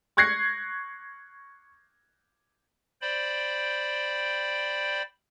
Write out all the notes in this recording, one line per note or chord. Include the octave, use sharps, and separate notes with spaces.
C#6 F#6 G#6 A#6 C7 C#7
C5 D5 G5 B5